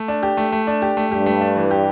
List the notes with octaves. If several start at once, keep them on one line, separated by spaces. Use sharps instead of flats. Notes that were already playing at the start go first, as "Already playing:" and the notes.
Already playing: A3
D4
G4
A3
A3
D4
G4
A3
G2 G4
A3
D4
E3
G4